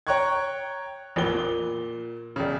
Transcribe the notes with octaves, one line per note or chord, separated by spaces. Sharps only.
C#5 G5 A#5 C#6 F#6 G#6
A1 F2 A#2 B3 B4 G7
A#2
E1 C#3